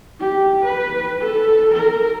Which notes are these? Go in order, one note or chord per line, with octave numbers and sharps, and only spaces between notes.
G4
B4
A4
A#4